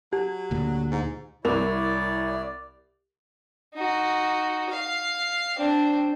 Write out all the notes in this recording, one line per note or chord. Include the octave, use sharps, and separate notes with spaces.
F#3 G4
D2 A#2
G#2
C2 E4 A#4 C#5 D5 F7
D#4 F#4
F5
C4 D4